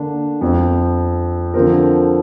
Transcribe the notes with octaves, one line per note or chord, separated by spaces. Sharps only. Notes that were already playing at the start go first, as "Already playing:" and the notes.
Already playing: D3 A#3 D4
F2 F3 C4
D3 F3 C4 A#4